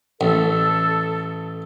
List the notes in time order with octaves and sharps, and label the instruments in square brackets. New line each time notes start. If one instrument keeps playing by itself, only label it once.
[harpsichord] A1 [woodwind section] A4